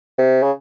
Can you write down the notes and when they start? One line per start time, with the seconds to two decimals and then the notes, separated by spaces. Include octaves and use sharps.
0.18 C3
0.43 C#3